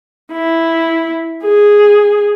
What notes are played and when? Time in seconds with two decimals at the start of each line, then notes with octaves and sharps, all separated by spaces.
0.32 E4
1.44 G#4